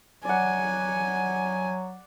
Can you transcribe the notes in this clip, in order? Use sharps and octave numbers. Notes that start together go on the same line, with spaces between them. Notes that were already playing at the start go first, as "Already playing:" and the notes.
F#3 D5 F#5 G#5